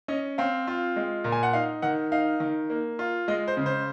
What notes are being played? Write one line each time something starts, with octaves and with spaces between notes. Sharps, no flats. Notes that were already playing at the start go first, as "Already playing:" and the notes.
C#4 D#5
C4 F5
F4
G#3
A#2
G#5
F#5
D#4 F5
D#3 F#5
D#4 F5
D#3
A#3
F4
G#3 D#5
C5
C#3
C5